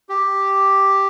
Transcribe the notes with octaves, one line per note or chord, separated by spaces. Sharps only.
G4